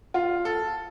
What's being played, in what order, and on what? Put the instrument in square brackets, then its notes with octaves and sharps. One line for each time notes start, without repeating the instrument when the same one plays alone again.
[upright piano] F4
A4